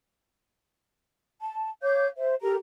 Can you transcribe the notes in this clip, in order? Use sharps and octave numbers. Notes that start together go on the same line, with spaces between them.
A5
C#5 F5 D6 G6
C5 E5
G4 A4 A#4 A#5